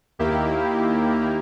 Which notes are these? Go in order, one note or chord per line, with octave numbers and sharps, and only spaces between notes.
D#2 D#3 A#3 E4 G4